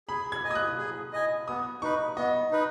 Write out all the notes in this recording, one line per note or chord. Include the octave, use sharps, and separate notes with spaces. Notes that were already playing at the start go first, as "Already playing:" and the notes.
G#4 B5
G#6
D#5 G#5
D#6
F#6
G#4
D#5 G#5
B3 D#6
D#4 B4 C#6
B3 D#5
D#4 B4